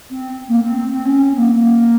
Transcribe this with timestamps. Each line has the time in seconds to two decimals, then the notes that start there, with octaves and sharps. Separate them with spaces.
0.10 C4
0.48 A#3
0.62 C4
0.77 C4
0.91 C4
1.05 C#4
1.34 C4
1.37 A#3